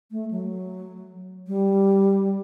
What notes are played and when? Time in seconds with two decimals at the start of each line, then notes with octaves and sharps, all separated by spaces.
0.11 A3
0.31 F#3
1.47 G3